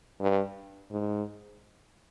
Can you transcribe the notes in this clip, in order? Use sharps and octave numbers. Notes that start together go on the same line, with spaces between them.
G2
G#2